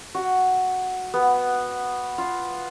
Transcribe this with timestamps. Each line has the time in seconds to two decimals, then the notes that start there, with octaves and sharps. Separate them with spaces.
0.14 F#4
1.14 B3
2.18 F4